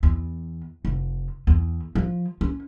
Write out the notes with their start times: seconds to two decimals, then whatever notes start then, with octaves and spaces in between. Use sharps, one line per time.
0.03 E2
0.85 F1
1.47 E2
1.95 F3
2.41 C#4